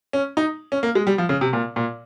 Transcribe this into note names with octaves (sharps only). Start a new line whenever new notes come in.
C#4
D#4
C#4
A#3
G#3
G3
F3
C#3
C3
A#2
A#2